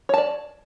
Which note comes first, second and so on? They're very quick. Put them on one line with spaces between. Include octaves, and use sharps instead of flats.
C#5 A5 D5